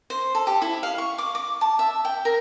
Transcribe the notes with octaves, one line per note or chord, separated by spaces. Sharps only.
C5
A4
G4
E4
F5
C#6
D6
D6
A5
E5
G5
A#4